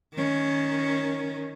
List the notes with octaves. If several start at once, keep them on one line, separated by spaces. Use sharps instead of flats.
D#3 C#4